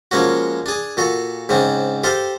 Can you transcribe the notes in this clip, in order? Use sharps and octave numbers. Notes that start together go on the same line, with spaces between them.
F3 G#3 A#3 C#4 F#4
D4 G#4
A#2 F#4 A4
G#2 C#3 C4 D4
G4 A4 C5 F5 G5 A5